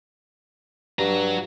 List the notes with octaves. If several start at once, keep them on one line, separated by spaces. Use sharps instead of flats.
G2 F#4 A#5